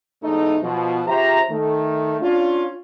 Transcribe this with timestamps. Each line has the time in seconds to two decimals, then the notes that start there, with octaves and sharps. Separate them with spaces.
0.23 E2 G#2 A3 D#4
0.62 B2 F3
1.08 C#3 F4 G4 C5 E5 A#5
1.51 D#3 A3
2.22 C#4 D4 F4